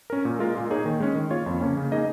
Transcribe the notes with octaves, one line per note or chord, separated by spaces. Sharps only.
C#4 A#4
A#2
G#3 F4 A#4
A#2
A#3 D#4 G#4 C#5
D#3
G#3 C#4
D#3
A#3 F4 C#5
F2
C#3 A#3 C#4
C#3
A#3 D#4 G#4 D#5